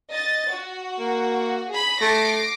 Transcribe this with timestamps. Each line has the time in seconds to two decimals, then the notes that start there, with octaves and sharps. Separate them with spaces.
0.12 D#5 A6
0.52 F#4
0.99 A#3
1.72 G#4 B5
2.01 A3 D6 A#6 C7